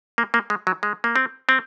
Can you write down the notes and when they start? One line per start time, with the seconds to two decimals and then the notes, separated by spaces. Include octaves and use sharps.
0.18 A#3
0.34 A#3
0.50 G#3
0.67 F#3
0.83 G#3
1.04 A#3
1.16 C4
1.49 C4